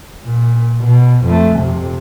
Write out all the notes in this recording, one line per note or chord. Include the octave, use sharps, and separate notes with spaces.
A#2
B2
F2 A3
F2 C3